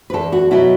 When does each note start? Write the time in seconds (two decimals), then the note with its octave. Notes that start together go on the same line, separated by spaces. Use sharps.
0.10 B4
0.13 E2 A4
0.32 F#4
0.51 B2 F#3 E4